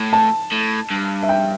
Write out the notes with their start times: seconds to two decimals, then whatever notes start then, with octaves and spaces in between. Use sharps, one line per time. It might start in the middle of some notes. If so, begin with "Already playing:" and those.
Already playing: A2
0.13 A5
0.52 A2
0.90 G2
1.23 E5
1.29 G5